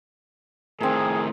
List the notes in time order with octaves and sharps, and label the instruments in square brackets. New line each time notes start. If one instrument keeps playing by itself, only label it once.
[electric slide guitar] A2 D#3 [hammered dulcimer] C4 A#4 [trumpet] G#4